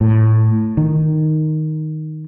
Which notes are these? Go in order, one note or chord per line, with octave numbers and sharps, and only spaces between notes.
A2
D#3